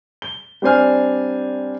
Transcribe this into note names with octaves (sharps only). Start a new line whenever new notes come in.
G7
G3 C4 D4 C5 G#5 F6